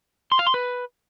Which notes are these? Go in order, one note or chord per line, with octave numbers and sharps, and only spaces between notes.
C6
F5
C6
B4